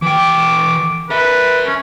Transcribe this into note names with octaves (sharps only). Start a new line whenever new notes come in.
E3 G5 D6
A#4 B4 E5
C#4